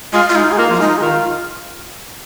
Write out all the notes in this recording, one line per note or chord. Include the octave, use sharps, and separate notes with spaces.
G#3 F4
F4
G#3 D#4
G#4
A#3 F4
F3 F4
G#3 D#4
G#4
D#3 F4